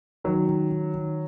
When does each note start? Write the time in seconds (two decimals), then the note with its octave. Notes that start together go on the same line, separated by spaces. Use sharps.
0.24 D#3 F#3
0.48 D#3
0.71 D#3
0.94 D#3